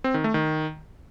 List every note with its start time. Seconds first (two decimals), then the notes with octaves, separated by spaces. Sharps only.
0.04 C4
0.14 D#3
0.24 A3
0.34 D#3